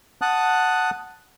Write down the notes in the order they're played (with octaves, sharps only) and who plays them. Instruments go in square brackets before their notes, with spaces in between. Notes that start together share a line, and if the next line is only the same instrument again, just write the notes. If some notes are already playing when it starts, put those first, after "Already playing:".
[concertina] F#5 A5 D#6 F#6